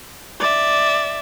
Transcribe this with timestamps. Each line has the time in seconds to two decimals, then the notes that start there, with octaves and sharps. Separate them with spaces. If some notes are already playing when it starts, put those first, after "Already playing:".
0.40 D5 E5